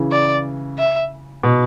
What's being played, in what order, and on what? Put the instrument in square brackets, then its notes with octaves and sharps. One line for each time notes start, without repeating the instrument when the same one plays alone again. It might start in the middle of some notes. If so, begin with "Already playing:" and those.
Already playing: [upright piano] C#3 E3
[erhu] D5
E5
[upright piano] B2